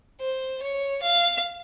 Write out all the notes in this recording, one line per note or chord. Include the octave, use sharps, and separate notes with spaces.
C5
C#5
F5